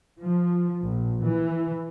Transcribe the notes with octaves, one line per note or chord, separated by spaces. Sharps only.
F3
A#1
E3